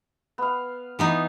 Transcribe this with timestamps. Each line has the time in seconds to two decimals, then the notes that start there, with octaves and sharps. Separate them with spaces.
0.38 B3 F5
0.99 E3 B3 D#4